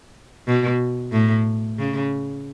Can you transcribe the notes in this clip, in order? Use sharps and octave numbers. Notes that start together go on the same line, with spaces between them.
B2
A2
C#3